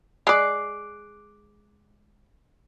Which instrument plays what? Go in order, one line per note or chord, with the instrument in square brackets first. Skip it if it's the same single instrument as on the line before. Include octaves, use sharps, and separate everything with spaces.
[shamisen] G#3 D5 [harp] D6 F#6 C7